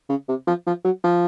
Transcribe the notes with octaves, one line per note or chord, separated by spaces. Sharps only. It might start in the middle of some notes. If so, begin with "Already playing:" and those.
C#3
C3
F3
F3
F#3
F3